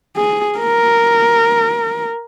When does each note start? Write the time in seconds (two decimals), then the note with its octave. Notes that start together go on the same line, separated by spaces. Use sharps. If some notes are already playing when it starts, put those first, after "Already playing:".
0.17 G#4
0.59 A#4